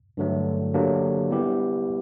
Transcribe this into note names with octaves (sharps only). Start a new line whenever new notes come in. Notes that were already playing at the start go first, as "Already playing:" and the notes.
G2 D3 F#3 A3
D3 F#3 A#3 D4 G4
G3 B3 E4 G4